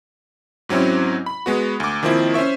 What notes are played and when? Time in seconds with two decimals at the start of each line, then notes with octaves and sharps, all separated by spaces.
0.69 G#2 F#3 C4 C#4 E4
1.26 B5
1.46 G#3 B3 F#4
1.80 D2 D6
2.03 D#3 F3 A#3 C4 E4
2.34 C#4 C5 E5 C#6